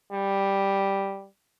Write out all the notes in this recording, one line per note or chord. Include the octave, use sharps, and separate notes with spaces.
G3